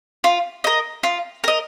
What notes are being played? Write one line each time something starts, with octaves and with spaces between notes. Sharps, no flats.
F4
A#4 D#5
F4
A#4 D#5